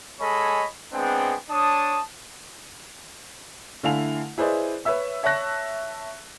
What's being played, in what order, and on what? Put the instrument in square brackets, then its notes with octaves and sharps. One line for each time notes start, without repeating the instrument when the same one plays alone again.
[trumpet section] G#3 A4 C#5 D#5 G#5 B5
G#3 B3 C4 D4 G#4 G5
D4 C#5 A5 D#6
[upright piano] D3 A3 E4 F5 G#5 F7
E4 G#4 B4 C5 D5 D#5
B4 C#5 E5 E6
C#5 E5 A5 C#6 F#6 A#6